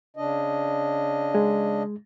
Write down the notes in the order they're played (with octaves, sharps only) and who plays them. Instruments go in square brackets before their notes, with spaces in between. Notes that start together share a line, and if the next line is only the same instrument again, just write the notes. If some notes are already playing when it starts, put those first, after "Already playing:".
[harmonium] C#3 D4 D#5
[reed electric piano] G#3